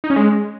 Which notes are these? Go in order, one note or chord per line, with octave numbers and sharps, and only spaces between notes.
D#4
C#4
G#3